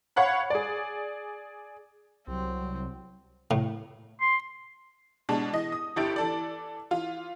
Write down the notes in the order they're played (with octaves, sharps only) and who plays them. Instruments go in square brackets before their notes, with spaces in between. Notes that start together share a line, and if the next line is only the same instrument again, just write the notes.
[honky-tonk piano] C#5 F5 F#5 B5
G#4 D5
[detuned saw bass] C2 [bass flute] F#3 [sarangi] C4
[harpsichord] A2
[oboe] C6
[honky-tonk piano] B2 G#3 D4
E3 D#5
D#6
G1 E4 G4 A6 D7
E3 A4 D5
E3 F4